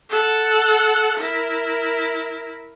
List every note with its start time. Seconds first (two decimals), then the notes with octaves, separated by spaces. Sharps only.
0.10 A4 F#5
1.18 E4 A#4